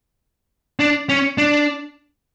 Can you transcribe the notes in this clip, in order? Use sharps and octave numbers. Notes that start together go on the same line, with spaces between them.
D4
C#4
D4